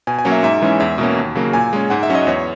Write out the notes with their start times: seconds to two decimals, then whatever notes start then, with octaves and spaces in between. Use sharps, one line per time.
0.07 B2 G#5
0.19 G#5
0.25 F#3 A#3 C#4
0.32 E5
0.43 G#2 E5
0.62 E3 G#3 C#4
0.80 E2 E5
0.98 B2 A#3 C#4
1.17 D#2
1.35 C#3 F#3 A#3
1.53 A#2 G#5
1.73 G#3 C#4
1.90 G#2 F#5
2.03 E5
2.10 F#3 C#4
2.15 D#5
2.27 E2 C#5